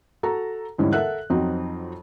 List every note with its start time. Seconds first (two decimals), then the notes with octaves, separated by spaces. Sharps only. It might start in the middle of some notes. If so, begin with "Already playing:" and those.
0.23 F#4 A4 A#5
0.78 E2 G#2 D3 E3 G3 C#4
0.93 A4 A#4 E5 F#5 F#6
1.30 F2 F#3 C4 D#4